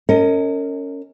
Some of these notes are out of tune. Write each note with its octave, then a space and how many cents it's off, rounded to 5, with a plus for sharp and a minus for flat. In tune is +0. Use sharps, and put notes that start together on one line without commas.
C#4 +0 A#4 -35 D#5 +20